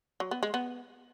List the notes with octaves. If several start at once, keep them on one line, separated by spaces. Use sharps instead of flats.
F#3
B3
G#3
B3